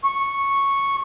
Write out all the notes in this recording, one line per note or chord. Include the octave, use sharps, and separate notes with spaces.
C#6